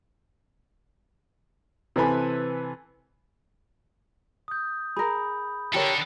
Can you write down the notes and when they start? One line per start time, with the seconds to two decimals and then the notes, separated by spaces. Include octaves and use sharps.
1.96 C3 E3 A4 B4 G#5 B5
4.48 D#6 G6
4.97 G#4 A#4 B5
5.74 D3 G4 A4 A#4 C#5